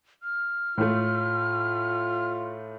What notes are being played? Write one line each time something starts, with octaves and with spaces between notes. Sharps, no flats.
F6
A2 A3 F4